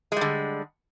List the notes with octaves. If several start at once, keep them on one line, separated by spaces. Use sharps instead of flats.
D3 G3 G#3